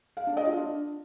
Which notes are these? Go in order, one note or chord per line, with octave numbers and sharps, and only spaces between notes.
F5
D4
D#5
F4
D4